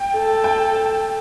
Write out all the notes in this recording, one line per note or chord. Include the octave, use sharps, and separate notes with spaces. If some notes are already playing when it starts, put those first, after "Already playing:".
Already playing: G5
A4
G5